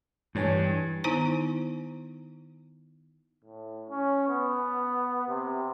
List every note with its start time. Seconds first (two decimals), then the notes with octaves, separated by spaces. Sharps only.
0.35 G2 E3 C#5 G#5
1.04 D#3 B3 D#4 E4 C5 A#5
3.45 A2
3.89 C#4
4.29 B3
5.28 C3